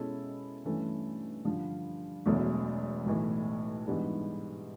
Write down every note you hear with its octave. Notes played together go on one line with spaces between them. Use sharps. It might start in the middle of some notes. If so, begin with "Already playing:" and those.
Already playing: B2 G#3 C#4 E4 A4
G2 E3 A3 C#4
G2 D3 F3
E1 E2 B2 F#3 A3
B1 A2 E3
G#2 E3 G3 B3 D4